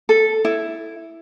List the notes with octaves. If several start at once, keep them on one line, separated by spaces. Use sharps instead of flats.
A4
E4